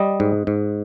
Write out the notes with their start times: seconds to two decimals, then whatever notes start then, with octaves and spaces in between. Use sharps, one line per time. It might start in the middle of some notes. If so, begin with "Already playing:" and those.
Already playing: G3 D#5
0.20 G#2
0.47 G#2